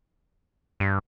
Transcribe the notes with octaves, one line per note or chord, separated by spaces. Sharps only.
G2